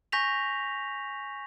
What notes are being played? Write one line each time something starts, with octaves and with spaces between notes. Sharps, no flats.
G#5 C#6 G6 A#6 B6 F7